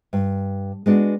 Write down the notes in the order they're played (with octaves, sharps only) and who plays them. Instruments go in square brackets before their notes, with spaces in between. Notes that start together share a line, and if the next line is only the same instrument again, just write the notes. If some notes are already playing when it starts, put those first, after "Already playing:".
[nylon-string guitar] G2
G#3 B3 D4 F#4